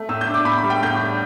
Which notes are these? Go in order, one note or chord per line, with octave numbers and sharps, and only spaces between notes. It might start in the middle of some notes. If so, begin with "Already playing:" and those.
Already playing: A3
A2 E6
G6
D4
D6
A2 B5
B5
G3
G5
A2 G6
D4